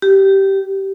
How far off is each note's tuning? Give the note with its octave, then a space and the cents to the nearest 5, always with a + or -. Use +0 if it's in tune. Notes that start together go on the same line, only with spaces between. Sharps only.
G4 -15